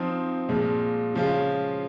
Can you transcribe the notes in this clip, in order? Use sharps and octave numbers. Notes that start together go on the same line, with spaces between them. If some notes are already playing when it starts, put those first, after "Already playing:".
Already playing: F3 C4 D#4
A#2 F3 G#3
C#3 F3 G#3 C#4 F4